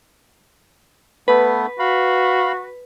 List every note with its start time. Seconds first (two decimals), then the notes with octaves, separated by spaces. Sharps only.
1.28 A3 B3 B4
1.79 F#4 F5 B5